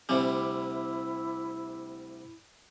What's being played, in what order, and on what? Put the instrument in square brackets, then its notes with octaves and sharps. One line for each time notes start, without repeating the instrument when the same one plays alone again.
[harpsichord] D2 C3 G3 [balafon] C4 [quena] E4